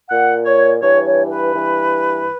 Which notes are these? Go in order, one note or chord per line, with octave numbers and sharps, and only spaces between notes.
A#2 F#5
C#5
G2 E3 C#5
C#5
B4
G2 E3